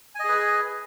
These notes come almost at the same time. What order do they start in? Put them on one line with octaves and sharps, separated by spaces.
G#5 D#5 G#4 B4